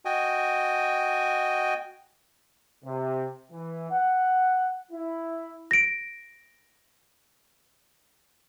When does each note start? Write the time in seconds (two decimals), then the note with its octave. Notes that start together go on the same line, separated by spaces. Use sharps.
0.05 F#4 D#5 G5 G#5
2.84 C3
3.52 E3
3.91 F#5
4.92 E4
5.71 A#6 D7